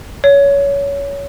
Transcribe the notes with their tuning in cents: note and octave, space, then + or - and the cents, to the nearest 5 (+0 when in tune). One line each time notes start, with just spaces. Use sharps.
C#5 +20